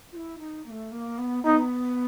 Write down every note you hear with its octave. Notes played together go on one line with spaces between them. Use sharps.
F4
E4
D#4
A#3
A3
A#3
B3
B3 D#4